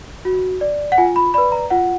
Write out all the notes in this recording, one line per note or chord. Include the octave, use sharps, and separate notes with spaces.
F#4
D5
F#5
F4 G#5
B5
B4 D5 B5
A#5
F4 F#5